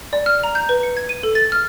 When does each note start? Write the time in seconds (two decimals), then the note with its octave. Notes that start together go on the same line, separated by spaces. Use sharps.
0.13 D5
0.26 F6
0.43 A#5
0.55 G6
0.69 B4
0.83 C#7
0.97 G#6
1.09 D#7
1.23 A4
1.35 A6
1.52 F6